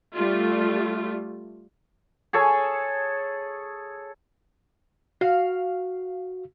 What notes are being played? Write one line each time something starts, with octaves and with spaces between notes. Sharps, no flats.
G3 A3 F4
G#4 A4 C#5
F#4 F5